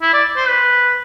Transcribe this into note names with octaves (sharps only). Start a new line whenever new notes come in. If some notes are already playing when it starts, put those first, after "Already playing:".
E4
D5
C5
B4